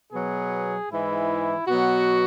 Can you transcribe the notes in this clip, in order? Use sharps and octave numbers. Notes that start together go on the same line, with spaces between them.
B2 F#3 B3 G#4
G#2 E3 G#3 E4
B2 F#3 B3 F#4